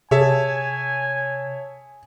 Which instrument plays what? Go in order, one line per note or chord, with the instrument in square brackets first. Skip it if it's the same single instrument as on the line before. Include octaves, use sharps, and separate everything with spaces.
[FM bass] C3 [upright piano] G#4 [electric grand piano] C#5 E5 A5 [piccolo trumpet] G#5